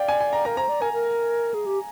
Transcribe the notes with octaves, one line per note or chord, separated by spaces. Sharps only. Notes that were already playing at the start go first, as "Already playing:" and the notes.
Already playing: D5 F5 G5
G#5
G#5
A#5
A#4 A#5
C5 A#5
D5
A#4 G#5
A#4
G#4
G4